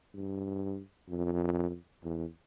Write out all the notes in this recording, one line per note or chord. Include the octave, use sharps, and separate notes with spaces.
G2
F2
E2